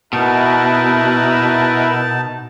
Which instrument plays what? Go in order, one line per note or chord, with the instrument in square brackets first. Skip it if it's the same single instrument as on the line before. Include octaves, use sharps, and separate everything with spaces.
[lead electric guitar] B2 [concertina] D#4 A5 [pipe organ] E4 A#4 B4